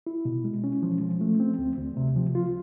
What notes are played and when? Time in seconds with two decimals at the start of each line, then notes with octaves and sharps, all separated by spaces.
0.07 E4
0.25 B2
0.44 G#3
0.64 C#4
0.83 F3
1.01 F3
1.21 A3
1.40 C4
1.59 D2
1.78 D2
1.97 C3
2.16 F3
2.35 F4